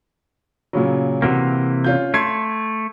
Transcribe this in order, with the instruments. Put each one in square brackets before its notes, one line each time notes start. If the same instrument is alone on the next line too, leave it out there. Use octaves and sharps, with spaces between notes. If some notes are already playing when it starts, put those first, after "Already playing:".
[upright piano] A#2 C#3 F#3
[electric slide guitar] C3 E3 A#3 [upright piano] F#4
[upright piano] C#4 F4 G6
[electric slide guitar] A3 [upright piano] C6 G#6 C7